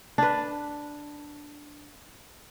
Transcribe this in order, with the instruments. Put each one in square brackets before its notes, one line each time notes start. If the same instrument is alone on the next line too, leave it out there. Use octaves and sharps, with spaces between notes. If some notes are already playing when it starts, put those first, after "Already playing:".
[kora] D4 B4